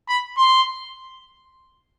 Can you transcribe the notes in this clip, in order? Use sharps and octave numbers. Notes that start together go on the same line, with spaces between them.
B5
C6